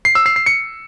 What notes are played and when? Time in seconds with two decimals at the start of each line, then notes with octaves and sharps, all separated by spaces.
0.05 C7
0.15 E6
0.26 C7
0.36 C7
0.46 C#7